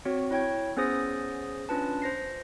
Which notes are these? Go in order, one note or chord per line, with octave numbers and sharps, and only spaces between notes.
C4 F#4 C#5
E4 C#5 G5 G#6
B3 C#4 G#4 C5 D#6 A#6
C#4 D4 F4 B4 A5
C5 A#6 C7